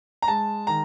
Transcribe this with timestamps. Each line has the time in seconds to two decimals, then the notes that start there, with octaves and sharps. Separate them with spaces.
0.22 A#5
0.28 G#3 A5
0.67 D#3 A#5